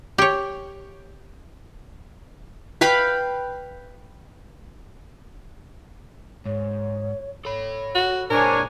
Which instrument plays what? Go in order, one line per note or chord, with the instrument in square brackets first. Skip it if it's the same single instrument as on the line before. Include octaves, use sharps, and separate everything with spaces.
[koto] G4 C#5
[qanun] B4 F5 G5 B5
[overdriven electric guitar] G#2 [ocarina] C#5
[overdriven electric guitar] A4 B5 [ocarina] C#5
[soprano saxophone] F#4
[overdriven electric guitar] A#2 G#3 [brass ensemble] D4 C#5 G#5 [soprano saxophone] A#4 [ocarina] C5